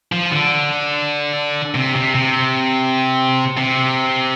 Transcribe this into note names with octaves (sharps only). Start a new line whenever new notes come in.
F3
D3
C3
C3
C3
C3